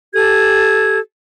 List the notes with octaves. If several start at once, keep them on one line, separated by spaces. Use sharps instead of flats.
G4 A4 G#6